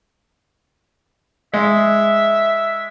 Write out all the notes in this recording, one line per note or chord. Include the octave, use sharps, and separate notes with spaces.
G#3 E5